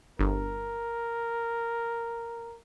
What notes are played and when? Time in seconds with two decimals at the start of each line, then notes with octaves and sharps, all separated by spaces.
0.19 G1 A#4